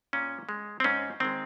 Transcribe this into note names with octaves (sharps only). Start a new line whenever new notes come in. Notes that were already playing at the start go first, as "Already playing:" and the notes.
A#2 C#4
G#3
C4
G#2 C#4
D#3 G#3 C4